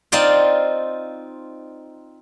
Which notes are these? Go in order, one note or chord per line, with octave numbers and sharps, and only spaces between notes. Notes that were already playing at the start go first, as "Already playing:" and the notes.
C4 D#4 F4 D5 F5 G5